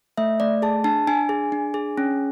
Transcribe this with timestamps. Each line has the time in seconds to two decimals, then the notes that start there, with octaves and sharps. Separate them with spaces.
0.17 A3 E5
0.40 A3 D5
0.62 G#4 A5
0.84 D4 A5
1.07 D4 G#5
1.29 G#4
1.52 D4
1.74 G#4
1.98 C#4